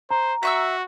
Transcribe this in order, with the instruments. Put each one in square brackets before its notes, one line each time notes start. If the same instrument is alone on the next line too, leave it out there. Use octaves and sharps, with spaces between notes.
[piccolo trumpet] C5 [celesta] A#5
[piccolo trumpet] F#4 [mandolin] E5 C#6 E6